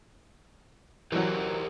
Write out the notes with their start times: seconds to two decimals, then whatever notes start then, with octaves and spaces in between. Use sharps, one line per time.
1.12 E3 F#3 G4 A#4 C5